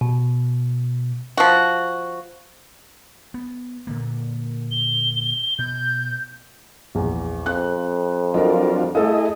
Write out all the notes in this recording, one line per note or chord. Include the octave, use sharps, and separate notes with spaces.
B2
F3 F#4
B3
A#2 D3 A#3
G7
B2 G6
A#1 E2
F2 F#6
F#3 D4 F4 A#4 D#5
A3 E4 G#4 A4 D#5 F5